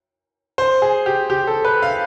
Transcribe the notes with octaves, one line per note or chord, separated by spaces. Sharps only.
C5
G#4
G4
G4
A4
B4
F5